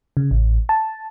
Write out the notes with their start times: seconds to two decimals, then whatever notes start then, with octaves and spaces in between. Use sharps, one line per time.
0.17 C#3
0.31 A1
0.69 A5